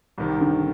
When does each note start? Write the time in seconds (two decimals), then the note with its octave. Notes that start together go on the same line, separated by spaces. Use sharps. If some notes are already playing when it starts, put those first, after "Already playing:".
0.18 C2 C3 D#3
0.41 D3 D4